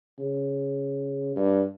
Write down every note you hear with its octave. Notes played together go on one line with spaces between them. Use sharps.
C#3
G2